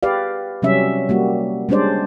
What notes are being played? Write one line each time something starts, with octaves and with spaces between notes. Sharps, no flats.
G4 B4 D5 F5
C3 F#3 G3 C#4 E5
G3 A#3 F#4
G3 G#3 C#4 D4 C5 D5